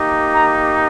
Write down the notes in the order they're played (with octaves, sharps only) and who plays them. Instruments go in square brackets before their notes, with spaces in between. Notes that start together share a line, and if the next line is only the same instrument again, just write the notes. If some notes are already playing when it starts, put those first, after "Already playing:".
Already playing: [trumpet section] A#3 D#4 G4
A#5